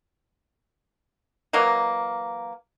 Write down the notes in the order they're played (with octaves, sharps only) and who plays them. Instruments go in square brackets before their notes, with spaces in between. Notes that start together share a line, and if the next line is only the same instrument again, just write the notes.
[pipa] E3 F#3 A#3 D#5